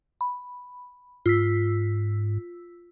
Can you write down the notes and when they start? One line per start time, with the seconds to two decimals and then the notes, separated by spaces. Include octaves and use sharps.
0.21 B5
1.26 G#2 F4 E6 B6